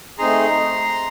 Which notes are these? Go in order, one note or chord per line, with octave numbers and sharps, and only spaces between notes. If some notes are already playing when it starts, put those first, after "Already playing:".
A3 C4 D#4 G#4 A#5 C6